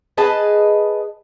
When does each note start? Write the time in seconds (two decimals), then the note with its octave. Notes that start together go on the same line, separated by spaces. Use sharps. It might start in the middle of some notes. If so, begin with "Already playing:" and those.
0.18 G#4 B4 D#5 A5